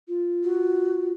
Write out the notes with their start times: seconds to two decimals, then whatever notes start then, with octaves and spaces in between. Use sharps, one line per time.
0.08 F4
0.43 F#4